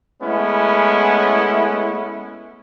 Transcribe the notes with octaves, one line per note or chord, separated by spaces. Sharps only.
G#3 A3 B3 C#4 E4